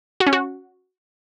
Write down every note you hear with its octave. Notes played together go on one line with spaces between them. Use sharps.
F#4
C#4
F#4